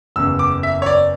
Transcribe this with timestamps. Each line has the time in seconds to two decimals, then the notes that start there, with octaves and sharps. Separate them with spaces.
0.16 F#1 E2 C#3 E6
0.39 D6
0.63 E5
0.82 C#5
0.86 D5